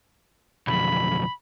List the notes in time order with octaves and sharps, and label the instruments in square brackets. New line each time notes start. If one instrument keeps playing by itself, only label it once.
[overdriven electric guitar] B1 F2 [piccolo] B5